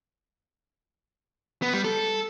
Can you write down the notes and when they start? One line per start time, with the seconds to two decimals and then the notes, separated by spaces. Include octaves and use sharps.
1.62 B3
1.73 G3
1.85 A4